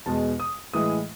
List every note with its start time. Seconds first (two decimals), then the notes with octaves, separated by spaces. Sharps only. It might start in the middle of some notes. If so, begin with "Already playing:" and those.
0.06 E2 B2 G#3 A5
0.40 D#6
0.73 A2 E3 G#3 D#6